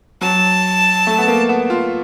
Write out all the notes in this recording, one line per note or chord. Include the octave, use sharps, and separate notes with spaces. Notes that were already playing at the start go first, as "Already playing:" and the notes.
F#3 A5
A3
B3
A#3
B3
F4